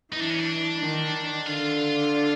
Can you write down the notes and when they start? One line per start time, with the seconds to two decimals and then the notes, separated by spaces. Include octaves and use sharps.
0.12 E3 D#4
0.21 D4
0.30 C#4
0.39 D4
0.78 D#3
1.45 D3 F4